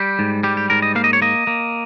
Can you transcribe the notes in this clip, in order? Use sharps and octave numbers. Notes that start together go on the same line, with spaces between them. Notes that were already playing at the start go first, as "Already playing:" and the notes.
Already playing: G3 G4
G#2
G3 G4
G4
G#2 A#4
D#5
A#3 F5
D#5
C#5
A#3 D#5
A#3